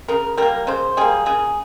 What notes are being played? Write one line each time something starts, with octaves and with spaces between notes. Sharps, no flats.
C#3 A#4
G3 A#3 A#4
C#3 C5
G3 A#3 G#4
C#3 G#4